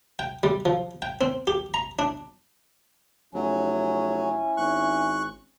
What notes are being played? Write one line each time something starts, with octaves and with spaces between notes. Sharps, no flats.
G5
G3
F3
G5
C4
G4
A#5
D4
F1 F#3 C#4 E4 G#5
G#1 C#6 F#6